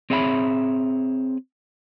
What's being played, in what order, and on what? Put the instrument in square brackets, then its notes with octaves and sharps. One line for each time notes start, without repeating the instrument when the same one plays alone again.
[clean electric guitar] C4 G#4 C#5 E5 G5 B5